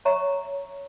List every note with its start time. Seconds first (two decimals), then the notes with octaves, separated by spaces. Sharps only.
0.05 C#5 E5 A#5 C#6